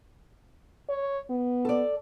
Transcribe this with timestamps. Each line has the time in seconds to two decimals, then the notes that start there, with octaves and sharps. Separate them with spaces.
0.90 C#5
1.30 B3
1.65 A4 D5